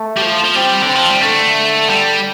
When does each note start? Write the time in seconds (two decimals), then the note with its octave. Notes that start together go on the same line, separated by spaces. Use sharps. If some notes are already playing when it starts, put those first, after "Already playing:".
Already playing: A3
0.17 G3
0.22 F3
0.44 F3
0.55 G3 C4
0.82 D3
0.89 C4
0.95 F3
1.09 G3
1.21 D3 A3
1.89 G3